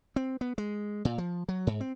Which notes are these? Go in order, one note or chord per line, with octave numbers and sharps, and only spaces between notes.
C4
B3
G#3
A#2
F3
F#3
G#2
C4